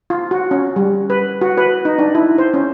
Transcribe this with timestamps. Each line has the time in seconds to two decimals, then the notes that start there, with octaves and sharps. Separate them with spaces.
0.10 F4
0.31 F#4
0.51 C#4
0.76 G3
1.10 B4
1.41 F#4
1.58 B4
1.85 D#4
1.98 D4
2.15 E4
2.38 C5
2.54 C#4